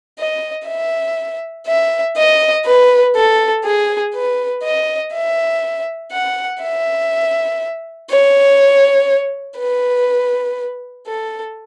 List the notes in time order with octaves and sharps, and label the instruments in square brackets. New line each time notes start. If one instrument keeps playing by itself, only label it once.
[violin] D#5
E5
E5
D#5
B4
A4
G#4
B4
D#5
E5
F#5
E5
C#5
B4
A4